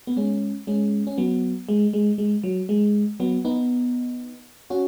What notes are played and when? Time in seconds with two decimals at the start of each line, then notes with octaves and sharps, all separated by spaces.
0.07 B3
0.17 G#3 C#4
0.67 G#3 C#4
1.07 C#4
1.18 F#3 B3
1.69 G#3
1.93 G#3
2.18 G#3
2.43 F#3
2.69 G#3
3.20 F#3 B3
3.45 B3 D#4
4.70 C#4 F#4